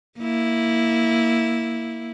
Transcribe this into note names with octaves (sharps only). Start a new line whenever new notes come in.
A#3 E4